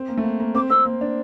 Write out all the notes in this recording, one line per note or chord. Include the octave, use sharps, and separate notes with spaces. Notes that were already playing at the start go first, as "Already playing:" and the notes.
Already playing: C4
A#3
A3
A#3
A#3
C4 D6
C4 E6
A#3
D4